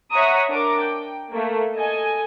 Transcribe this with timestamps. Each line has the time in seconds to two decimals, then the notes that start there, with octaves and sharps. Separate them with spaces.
0.12 C#5 E5 F#5 A#5 C#6 D#6
0.49 D4 A#4 A#5 D6
0.81 G5
1.30 A3 A#3
1.74 A4 D#5 G#5